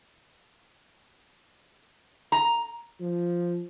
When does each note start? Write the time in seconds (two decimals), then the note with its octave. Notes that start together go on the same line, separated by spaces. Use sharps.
2.32 A#5
3.01 F3